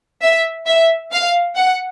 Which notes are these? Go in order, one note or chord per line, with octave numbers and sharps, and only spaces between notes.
E5
E5
F5
F#5